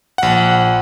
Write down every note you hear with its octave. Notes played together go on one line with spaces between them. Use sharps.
A#1 F#5